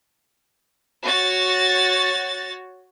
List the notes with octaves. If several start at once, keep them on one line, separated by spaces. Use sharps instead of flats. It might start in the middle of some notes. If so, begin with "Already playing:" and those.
F#4 C#5 A6